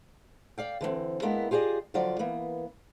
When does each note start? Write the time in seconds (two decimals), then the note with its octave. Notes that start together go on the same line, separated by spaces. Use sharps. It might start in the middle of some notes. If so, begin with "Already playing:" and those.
0.58 D5 F5 G5
0.81 D3 E3 G#3 C4
1.22 G#3 A#3 B3 D4 E4 A#4
1.51 F4 G4 G#4 B4 D5 D#5
1.94 D3 F3 F#3 F4 D5
2.19 E3 A#3 B3